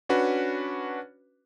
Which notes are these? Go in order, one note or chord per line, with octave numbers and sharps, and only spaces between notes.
C#4 D4 F#4 B4